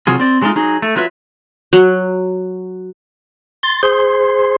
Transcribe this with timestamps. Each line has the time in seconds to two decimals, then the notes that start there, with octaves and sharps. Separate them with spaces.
0.07 C3 F#3 F4 G#4
0.20 C4 D5
0.42 F#3 G#3 A3 C4 D#4 F4
0.55 F#3 D#4 G#4
0.82 A3
0.96 F#3 F4 B4 E5
1.73 F#3
3.63 C6 A6
3.83 G#4 C5 C6